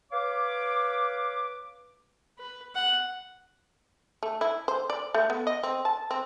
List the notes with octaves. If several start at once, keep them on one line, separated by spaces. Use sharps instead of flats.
B4 C#5 F5 D6
B4
F#5
A3
E4
C5
D5
A3
B3
D#5
C4
A5
C4